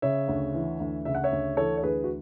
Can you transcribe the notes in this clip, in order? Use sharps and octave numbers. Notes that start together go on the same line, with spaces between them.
C#3 C#5 E5
D2
E3
D2
C#3 E5
F#5
C#5 E5
D2
E3 A4 C#5
C#5
D2 G#4 B4
F#4